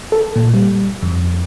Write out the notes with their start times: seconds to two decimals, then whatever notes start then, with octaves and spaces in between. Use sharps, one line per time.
0.12 A4
0.36 A#2
0.54 G3
1.02 F2